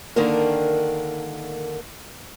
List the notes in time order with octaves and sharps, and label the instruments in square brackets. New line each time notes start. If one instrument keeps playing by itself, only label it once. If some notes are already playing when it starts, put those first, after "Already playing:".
[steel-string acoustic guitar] D3 D#3 A#3 D4 A#4